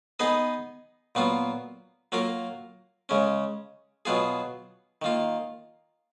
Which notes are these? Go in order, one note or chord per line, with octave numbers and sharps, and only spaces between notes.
B3 D#4 G#4 B4 D#5
A#2 F#3 B3 F4
F#3 A#3 F4 A#4
C#3 G#3 C#4
B2 F#3 B3 F4 G#4
D#3 A#3 F4